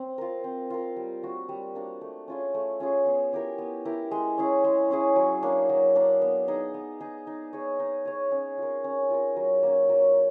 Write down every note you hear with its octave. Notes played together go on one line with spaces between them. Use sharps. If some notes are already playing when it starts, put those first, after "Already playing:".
Already playing: C4
F4 A#4
C4
F4 A#4
G3
A#3 D4 F#4
G3
A#3 D4 F#4
A3
C#4 F4 G#4
A3
C#4 F4 G#4
B3
E4 G4 A#4
B3
E4 G4 A#4
G#3
C#4 E4 G#4
G#3
C#4 E4 G#4
F#3
A#3 D4
F#3
A#3 D4
B3
D#4 G#4
B3
D#4 G#4
D#4
G#4 C#5
D#4
G#4 C#5
C#4
F4 A#4
C#4
F4 A#4
F#3
A#3 C#4
F#3